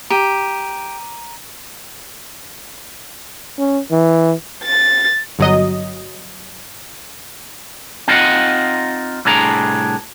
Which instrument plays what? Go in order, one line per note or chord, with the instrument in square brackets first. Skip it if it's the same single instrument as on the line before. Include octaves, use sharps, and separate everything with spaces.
[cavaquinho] G4 [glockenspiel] A#5 D#7
[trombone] C#4
E3
[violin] A6
[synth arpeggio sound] G1 F#3 D#5
[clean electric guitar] C4 D#4 F4 C5 D#5 F#5
C2 A2 D4 G#4 A#5